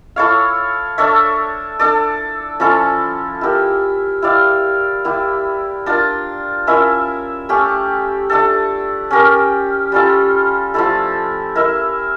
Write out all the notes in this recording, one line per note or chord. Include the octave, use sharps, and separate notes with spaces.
E4 A4 C#5 F5
D4 A4 C#5 E5
D4 A4 D5
F3 C#4 E4 A4
E4 G4 A#4
E4 G4 D5 F5
A#3 E4 G4
D4 F4 A#4
C#4 E4 A#4 E5
A3 C#4 G4
A3 D4 A4
C#4 G4 A#4
G3 C#4 F4 A4
F3 A3 E4 A4
E4 A#4 E5